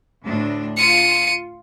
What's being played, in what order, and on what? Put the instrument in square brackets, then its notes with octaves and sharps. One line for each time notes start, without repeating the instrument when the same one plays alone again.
[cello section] D2 A2 D4
[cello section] F4 [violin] C#7 D#7